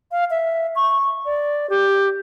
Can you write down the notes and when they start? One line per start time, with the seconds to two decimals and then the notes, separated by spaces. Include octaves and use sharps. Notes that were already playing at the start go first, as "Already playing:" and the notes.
0.12 F5
0.31 E5
0.76 C#6
1.25 D5
1.70 G4